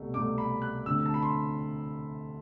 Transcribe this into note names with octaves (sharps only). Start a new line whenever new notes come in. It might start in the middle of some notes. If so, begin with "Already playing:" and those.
Already playing: C2 B2 A3
C2 B2 A3 D6
B5
F#6
D2 D3 A3 C4 E6
A5
B5
C6